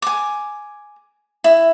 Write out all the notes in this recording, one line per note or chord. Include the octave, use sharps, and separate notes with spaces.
G#5 D6
E4